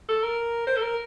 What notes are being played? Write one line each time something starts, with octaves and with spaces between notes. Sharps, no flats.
A4
A#4
C5
A4
A#4